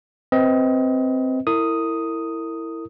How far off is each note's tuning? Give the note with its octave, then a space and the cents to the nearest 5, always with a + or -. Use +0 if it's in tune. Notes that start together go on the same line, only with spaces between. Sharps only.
C4 +0 B4 +0 D#5 +30
E4 +0 A#4 -35 D#6 +0